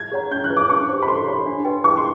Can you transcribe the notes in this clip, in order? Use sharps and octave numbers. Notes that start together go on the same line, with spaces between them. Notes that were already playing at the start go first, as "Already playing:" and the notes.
Already playing: G#6
G#4 C#5 F#5 A#5
C#4 G6
F#6
F4 G#4 B4
D6
D4 C#6
G4 C5
B5
A4 C6
C#5 E5
D4
F#4 B4 D#5 G5
E4 C#6
C6